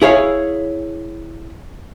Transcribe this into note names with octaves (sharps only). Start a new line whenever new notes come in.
E4 G#4 C#5 F5